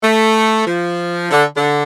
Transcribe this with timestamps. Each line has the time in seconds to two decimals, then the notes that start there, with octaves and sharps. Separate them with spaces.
0.02 A3
0.65 F3
1.30 D3
1.56 D3